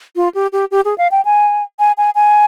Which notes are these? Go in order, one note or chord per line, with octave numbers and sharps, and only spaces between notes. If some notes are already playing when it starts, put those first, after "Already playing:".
F4
G4
G4
G4
G#4
F5
G5
G#5
G#5
G#5
G#5